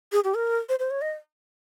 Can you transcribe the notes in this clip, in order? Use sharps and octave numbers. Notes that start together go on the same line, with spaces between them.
G#4
G4
A#4
C5
C5
C#5
D#5